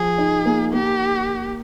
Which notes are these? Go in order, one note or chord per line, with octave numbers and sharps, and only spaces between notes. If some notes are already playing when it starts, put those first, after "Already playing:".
Already playing: F3 G#4
D#4
A#3
A#3 G4